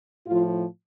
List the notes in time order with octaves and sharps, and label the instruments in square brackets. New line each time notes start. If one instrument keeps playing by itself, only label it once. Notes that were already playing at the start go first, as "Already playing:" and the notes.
[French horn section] A2 F3 F4